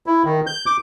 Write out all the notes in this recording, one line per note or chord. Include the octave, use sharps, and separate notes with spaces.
E4
D#3
G6
D6